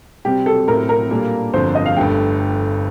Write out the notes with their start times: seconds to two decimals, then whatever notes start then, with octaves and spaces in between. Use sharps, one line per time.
0.25 C3 G3 C4 G4
0.46 A4
0.67 A2 A3 C4 A#4
0.89 A#4
1.10 A#2 G3 A#3 D4 A4
1.53 G1 F2 D3 F3 C5
1.75 D#5
1.86 F5
1.96 G1 G2 D3 A3 G5